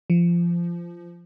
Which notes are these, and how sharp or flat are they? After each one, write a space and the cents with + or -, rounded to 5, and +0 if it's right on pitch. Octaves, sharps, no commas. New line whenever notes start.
F3 -20